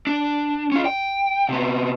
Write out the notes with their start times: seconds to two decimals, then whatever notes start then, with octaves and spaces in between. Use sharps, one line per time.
0.07 D4
0.72 C#4 F4
0.86 G5
1.49 C3 B3